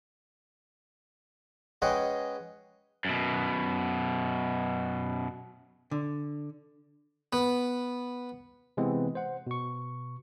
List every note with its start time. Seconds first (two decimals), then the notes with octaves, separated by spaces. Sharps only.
1.82 G#3 C#4 B4 D#5 F#5 G5
3.05 F#2 B2
5.91 D3
7.33 B3
8.77 C3 E3 G#3 B3 C4
9.15 C5 F#5
9.47 B2 C#6